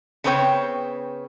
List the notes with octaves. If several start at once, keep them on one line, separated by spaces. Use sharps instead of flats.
C#3 B3 C4 B4 C#5 G5